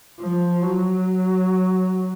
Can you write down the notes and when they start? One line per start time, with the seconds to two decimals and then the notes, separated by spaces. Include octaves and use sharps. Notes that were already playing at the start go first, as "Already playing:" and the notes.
0.20 F3
0.62 F#3